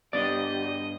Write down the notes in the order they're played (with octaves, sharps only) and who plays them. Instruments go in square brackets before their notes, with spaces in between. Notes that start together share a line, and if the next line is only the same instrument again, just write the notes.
[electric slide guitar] G2 B3 D4 [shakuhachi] G4 [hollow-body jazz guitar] D5 [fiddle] D#5